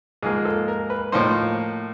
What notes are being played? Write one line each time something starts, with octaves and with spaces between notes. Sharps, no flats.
G#2 F3 A#3 G#4
A4
A#4
B4
A2 F3 A#3 D#4 C5